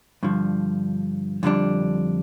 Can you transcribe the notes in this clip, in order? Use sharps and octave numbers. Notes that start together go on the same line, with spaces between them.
G2 D3 F3
F2 D3 G3 D4